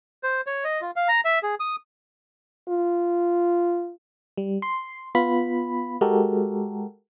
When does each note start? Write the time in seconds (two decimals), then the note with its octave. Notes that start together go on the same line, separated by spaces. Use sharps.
0.23 C5
0.47 C#5
0.64 D#5
0.81 F4
0.96 F5
1.08 A#5
1.25 E5
1.43 G#4
1.60 D#6
2.68 F4
4.37 G3
4.62 C6
5.15 B3 F4 B5
6.01 G#3 F#4 G4 A4 A#4